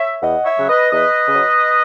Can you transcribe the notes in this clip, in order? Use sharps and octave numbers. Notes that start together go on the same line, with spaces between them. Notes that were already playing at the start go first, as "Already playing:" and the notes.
Already playing: C#5 E5
E2 D#5 F#5
C#5 E5
C#3 F#3
B4 D#5
E2 B4 D#5
C#3 F#3